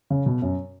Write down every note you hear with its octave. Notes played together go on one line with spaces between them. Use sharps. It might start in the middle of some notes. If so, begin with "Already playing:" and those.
C#3
B2
F#2